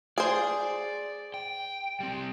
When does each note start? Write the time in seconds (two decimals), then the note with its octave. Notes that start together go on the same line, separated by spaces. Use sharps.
0.18 G#4 C5 D5
1.34 G5
2.00 G3 C4